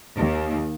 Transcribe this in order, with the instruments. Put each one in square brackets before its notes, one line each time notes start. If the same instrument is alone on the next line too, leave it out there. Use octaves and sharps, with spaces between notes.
[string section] D#2